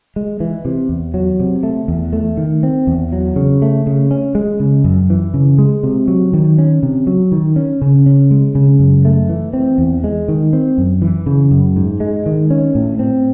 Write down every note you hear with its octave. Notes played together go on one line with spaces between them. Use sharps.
G#3
E3
C3
E2
F#3
C3
A3
E2
A3
D#3
C4
E2
F#3
C#3
A3
C#3
C#4
G#3
C#3
F#2
E3
C#3
G#3
C3
F#3
D#3
C#4
C3
F#3
D#3
C#4
C#3
C#4
G#3
C#3
F#2
A3
E3
C4
E2
G#3
D#3
C4
F#2
E3
C#3
F#2
G#2
G#3
D#3
C#4
A2
C4